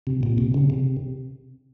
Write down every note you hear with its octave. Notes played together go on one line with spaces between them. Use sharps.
C3
A#2
C3
C#3
C3